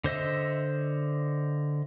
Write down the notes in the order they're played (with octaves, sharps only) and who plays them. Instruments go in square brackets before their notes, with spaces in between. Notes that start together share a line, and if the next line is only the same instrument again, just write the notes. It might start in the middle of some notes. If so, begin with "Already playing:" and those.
[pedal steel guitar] D3 C5 D#5 E5